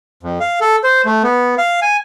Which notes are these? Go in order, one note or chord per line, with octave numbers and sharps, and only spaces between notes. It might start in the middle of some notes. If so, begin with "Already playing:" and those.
F2
F5
A4
C5
A3
B3
F5
G#5